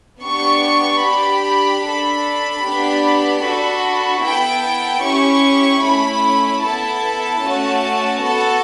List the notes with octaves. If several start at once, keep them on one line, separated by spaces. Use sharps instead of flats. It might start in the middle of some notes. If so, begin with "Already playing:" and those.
B3 D4 G4 C#6
D4 G4 B5
D4 A4
B3 D4 G4
D4 F#4 A4
B3 E4 A4 G5
C#4 E4 G4 C#6
A3 C#4 E4 B5
B3 E4 A4 A5
A3 C#4 F#4
B3 F#4 A4 A5